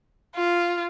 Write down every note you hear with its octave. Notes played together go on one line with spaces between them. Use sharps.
F4